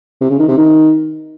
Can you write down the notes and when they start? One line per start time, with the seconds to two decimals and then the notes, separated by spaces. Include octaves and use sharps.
0.21 C3
0.30 C#3
0.39 D#3
0.48 C3
0.57 D#3